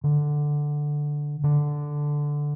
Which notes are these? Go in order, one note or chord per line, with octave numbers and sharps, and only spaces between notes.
D3
D3